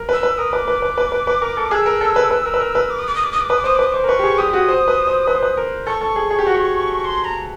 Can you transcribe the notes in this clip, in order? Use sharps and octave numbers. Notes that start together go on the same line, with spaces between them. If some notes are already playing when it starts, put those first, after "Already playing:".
Already playing: A#4
B4 E6
B4
E6
A#4 D#6
B4 D6
B4
B4
B4
B4
B4
A#4
A4
G#4 E6 F#6
A#4
A4
B4
B4
A#4
B4
A#4
B4
D6
D#6
D6
D#6
D6
D#6
D6
B4 D#6
D6
C5 D#6
D6
B4 D#6
C5 D6
A#4
B4 C#6
G4
G#4
G4 D#6
G4
F#4
C5
B4
C5
B4
C5
B4
A#4
A4 C#6
A4
G#4
G#4
G4
F#4
G4
C6
A#5